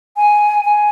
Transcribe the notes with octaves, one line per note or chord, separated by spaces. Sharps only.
G#5
G#5